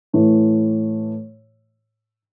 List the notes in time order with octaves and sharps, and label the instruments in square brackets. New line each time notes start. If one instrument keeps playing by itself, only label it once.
[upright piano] A2 E3 A3